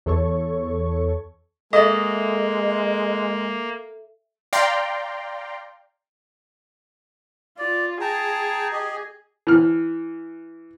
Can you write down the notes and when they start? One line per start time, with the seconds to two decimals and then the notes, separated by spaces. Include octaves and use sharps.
0.06 E2 A4 C#5 C#6
1.73 G#3 A#3 A4 D#5 E5
4.53 D5 F5 G5 A#5 C6
7.58 F4 D5
8.01 G#4 G5 A5 A#5
8.72 G4 D#5
9.47 E3 F6